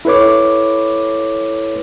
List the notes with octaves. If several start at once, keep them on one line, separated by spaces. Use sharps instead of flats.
E4 A4 B4 C#5 D6